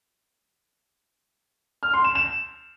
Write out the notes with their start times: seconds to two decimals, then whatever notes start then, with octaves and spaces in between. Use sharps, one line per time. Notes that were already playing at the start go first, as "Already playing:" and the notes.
1.83 F6
1.94 C6
2.04 E7
2.15 E7